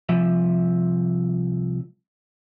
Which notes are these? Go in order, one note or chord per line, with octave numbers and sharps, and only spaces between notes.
C2 F3 E5